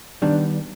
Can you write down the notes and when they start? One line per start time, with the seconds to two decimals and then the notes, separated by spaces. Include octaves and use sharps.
0.22 D#3 G3 B3 D4